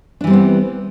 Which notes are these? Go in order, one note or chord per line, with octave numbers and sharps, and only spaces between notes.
E3 G3 B3 C4 D4